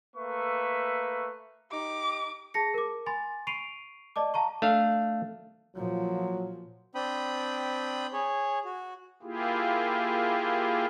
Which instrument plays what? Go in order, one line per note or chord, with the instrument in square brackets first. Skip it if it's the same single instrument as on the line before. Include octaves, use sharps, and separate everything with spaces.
[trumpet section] A3 A#3 B4 E5 C#6
[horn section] D#4 G4 [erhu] D6
[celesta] G#4 A5 A#6 C#7
A#4 D6
G#5 B5 C6 A6
B5 C#6 C7 D7 D#7 F7
D5 D#5 A5 D6
F5 A5 A#5 C#6
[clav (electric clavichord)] A3 D4 F5
[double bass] A#2 F3 [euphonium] F#3
[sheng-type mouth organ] C4 D4 G5 B5 D#6
G#4 C#5
F#4
[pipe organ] A#3 E4 F4 G4 G#4